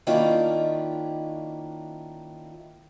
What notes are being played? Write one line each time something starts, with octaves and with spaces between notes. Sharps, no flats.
D#3 A#3 C#4 D4 E4 F4